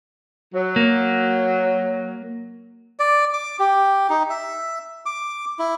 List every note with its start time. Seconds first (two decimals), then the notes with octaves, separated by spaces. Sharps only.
0.55 F#3
0.76 A#3
3.00 D5
3.34 D6
3.60 G4
4.10 D#4
4.30 E5
5.06 D6
5.59 E4